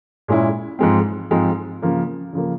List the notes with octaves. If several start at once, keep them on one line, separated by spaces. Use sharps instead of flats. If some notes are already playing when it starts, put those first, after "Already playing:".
A#2 G#3 C#4 E4
G#2 F3 G#3 C4
G#2 F3 G#3 C4
C#3 F3 A#3
C#3 F3 A#3